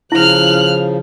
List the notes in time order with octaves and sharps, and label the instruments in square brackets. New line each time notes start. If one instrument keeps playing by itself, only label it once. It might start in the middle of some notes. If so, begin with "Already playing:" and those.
[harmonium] C#3 F3 [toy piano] E4 [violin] F6 F#6